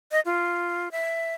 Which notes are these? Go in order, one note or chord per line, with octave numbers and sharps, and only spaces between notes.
D#5
F4
E5